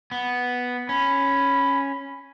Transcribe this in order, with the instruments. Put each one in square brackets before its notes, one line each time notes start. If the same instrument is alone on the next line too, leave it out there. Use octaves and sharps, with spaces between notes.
[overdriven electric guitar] B3
[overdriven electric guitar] C#4 [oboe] B5